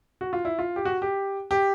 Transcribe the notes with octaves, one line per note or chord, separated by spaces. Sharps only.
F#4
F4
E4
F4
G4
F#4
G4
G4